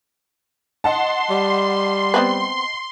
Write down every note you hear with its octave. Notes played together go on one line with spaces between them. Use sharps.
D#5 F#5 A5 C6
G3
B3 C4 B4